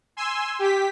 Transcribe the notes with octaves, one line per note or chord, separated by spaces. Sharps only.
G#5 C6 E6
G4 B6